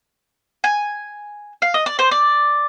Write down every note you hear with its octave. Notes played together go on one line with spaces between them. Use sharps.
G#5
F5
D#5
D5
C5
D5